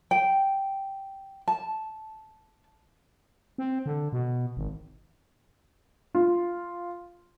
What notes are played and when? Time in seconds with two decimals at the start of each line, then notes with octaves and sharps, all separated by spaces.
0.11 G5
1.48 A5
3.58 C4
3.86 D3
4.13 B2
4.57 G#1
6.15 F4